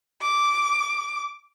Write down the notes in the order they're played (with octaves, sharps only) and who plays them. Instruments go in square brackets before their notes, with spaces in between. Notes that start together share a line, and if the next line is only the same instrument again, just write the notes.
[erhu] D6